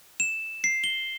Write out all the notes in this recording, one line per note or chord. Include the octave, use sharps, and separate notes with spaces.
E7
C7
G7